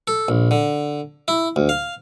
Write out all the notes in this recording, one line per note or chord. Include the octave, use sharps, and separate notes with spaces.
A4
A#1
D3
E4
D2
F5